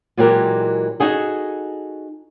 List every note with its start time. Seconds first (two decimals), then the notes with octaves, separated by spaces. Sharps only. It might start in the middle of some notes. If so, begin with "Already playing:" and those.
0.17 A#2 E3 F#3 G#3 G4 A#4
1.00 D#4 F#4 G#4 A4